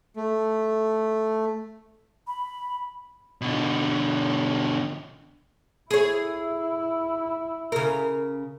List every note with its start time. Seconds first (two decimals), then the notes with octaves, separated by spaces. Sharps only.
0.16 A3
2.27 B5
3.41 B2 D3
5.91 E4 G#4 C#5
7.72 C#3 A#4